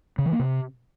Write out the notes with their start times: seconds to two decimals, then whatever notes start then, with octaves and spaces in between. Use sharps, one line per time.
0.18 C#3
0.25 E3
0.32 A#3
0.39 C3